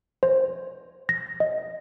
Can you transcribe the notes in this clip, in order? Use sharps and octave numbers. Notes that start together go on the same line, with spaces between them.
C5
A#6
D#5